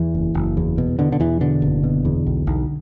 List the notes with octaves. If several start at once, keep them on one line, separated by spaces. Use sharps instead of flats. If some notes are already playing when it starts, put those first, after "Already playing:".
Already playing: E2 E3
F#1
F#1
E2
B2
B2 D3
D3
E2 E3
B2 D3
F#1
B2
E2
B1
B1